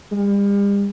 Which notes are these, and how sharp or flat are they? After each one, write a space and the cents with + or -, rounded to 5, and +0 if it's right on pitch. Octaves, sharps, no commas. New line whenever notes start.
G3 +40